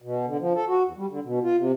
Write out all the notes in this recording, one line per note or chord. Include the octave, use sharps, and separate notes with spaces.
B2
D3
F3
A4
F#4
E2
G3
D3
B2
F4
C3